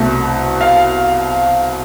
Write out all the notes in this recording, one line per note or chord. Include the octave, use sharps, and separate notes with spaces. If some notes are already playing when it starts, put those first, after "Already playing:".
Already playing: C2 B2 A3
F5